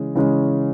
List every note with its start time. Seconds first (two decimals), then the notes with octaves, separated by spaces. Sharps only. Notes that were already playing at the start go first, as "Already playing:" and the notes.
Already playing: C#3 E3 G#3 C#4
0.15 C#3 E3 G#3 C#4